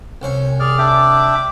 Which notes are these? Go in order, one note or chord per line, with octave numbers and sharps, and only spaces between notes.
C2 C#4 C5 C#5
G#4 D5 F6
D4 E5 G5 D6